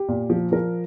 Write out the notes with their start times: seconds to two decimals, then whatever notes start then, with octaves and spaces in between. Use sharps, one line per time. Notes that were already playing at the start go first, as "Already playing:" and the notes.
Already playing: G4
0.08 A#2
0.30 F3
0.52 F3 A#4